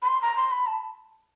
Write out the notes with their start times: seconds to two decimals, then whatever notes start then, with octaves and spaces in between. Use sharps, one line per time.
0.02 B5
0.07 C6
0.22 A#5
0.37 C6
0.51 B5
0.67 A5